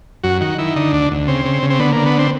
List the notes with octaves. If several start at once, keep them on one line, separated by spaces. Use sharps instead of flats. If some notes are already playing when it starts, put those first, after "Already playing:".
F#2 F#4
D#3 F#4
D#3 E4
D3 D#4
D2 D4
D2
C#3 C4
C#3
C#3
C4
D3 B3
D3 A#3
B3
C4